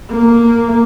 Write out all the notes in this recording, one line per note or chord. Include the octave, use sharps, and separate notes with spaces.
A#3